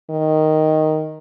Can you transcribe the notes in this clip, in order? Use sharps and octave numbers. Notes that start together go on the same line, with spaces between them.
D#3